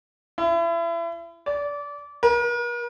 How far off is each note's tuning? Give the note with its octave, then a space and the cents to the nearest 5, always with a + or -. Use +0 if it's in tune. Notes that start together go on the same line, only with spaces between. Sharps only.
E4 +35
D5 -25
A#4 +45